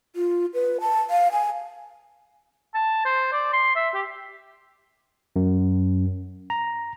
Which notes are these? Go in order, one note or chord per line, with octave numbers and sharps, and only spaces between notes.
F4
B4
A5
F5
G#5
A5
C5
D5
C6
E5
G4
F#2
A#5